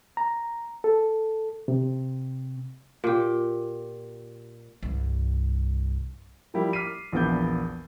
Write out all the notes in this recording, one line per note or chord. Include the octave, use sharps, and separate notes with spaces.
A#5
A4
C3
A#2 G4
C2 G2
F3 G3 A#3 E4 G4
D6 F6 B6 C7 D#7
A#1 E2 A#2 B3 D6 G6